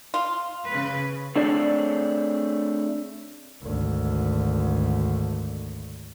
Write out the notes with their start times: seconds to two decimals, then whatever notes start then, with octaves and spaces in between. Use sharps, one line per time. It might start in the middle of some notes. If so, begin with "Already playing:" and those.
0.14 F4
0.68 C#3 B4
1.36 A3 C4 D4 G#4 C#5 D5
3.62 G#1 D2